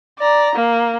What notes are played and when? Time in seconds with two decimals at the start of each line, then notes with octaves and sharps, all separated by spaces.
0.19 D5 A#5
0.56 A#3